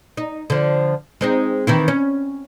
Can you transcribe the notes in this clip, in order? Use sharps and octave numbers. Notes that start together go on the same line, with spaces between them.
D#4
D3 F3
G#3 C4 D#4
D#3 E3 E4
C#4